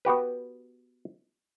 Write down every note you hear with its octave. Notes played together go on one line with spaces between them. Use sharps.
B3 F#4 G4 B4